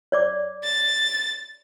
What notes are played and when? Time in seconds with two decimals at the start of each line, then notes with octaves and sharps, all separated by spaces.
0.12 C#5 D5 D6
0.64 A6